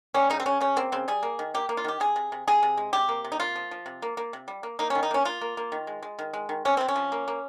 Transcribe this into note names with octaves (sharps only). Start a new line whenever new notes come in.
G3 C#4
C#3 D#4
C4
C#3 C#4
C#3 C#4
A#3 C4
C#3 C4
G3 G#4
A#3
D#3
A#3 G4
A#3
F4
D#3 G4
C3 G#4
C3
C3
C3 G#4
C3
G#3
C3 G4
A#3
C3
D#4
A#3 F4
F3
F3
C3
A#3
A#3
C3
G3
A#3
A#3 D#4
D#3 C#4
D#4
A#3 C#4
A#3 F4
A#3
A#3
D#3
G#3
G#3
D#3
G#3
D#3
C3 C#4
C3 C4
C#4
F3
A#3
A#3